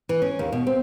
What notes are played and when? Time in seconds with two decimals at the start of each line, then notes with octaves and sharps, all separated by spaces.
0.09 E3
0.22 C#4
0.39 D#2
0.52 B2
0.67 C4